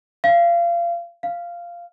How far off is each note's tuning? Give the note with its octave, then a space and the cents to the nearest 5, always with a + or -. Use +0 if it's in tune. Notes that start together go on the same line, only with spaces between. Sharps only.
F5 -30
F5 -10